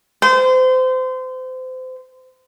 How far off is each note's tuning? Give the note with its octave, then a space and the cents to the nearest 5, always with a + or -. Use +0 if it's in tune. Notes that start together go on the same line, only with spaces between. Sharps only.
C5 -30